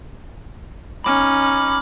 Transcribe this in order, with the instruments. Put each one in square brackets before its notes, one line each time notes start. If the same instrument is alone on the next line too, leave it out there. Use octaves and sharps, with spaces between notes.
[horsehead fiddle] C#4 D#4 [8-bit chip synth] B5 D6 F6